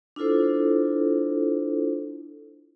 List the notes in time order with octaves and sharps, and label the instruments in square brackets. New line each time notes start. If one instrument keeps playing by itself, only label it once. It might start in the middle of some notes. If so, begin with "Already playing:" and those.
[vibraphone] D4 E4 F4 A4 C5